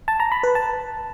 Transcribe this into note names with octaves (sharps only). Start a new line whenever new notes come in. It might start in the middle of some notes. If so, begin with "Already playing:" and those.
A5
A#5
B5
B4
A5